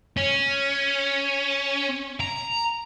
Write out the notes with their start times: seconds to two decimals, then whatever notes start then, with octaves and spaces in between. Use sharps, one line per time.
0.17 C#4
2.20 A#5